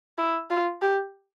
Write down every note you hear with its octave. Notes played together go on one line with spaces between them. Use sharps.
E4
F4
G4